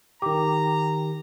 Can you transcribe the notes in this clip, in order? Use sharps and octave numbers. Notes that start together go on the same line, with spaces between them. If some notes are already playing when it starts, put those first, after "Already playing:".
D#3 G4 A#5 D6